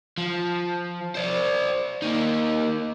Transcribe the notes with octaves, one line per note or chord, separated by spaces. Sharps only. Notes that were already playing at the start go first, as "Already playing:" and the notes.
F3
C5 D5
A#3 D#4